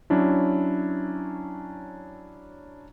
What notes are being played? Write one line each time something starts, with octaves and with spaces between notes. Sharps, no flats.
F#3 C#4 D4 E4